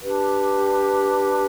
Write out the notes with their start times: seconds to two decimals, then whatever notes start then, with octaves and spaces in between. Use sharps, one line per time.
0.02 D4 G4 B4